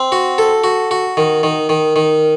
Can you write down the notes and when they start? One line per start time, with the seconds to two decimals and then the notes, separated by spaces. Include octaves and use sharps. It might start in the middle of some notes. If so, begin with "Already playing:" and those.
Already playing: C4
0.12 F#4
0.38 A4
0.64 F#4
0.91 F#4
1.17 D#3
1.43 D#3
1.69 D#3
1.96 D#3